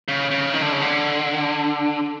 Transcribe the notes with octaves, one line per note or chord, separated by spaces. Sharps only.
C#3
C#3
D#3
D3
C#3
D3